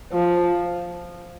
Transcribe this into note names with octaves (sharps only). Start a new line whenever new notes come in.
F3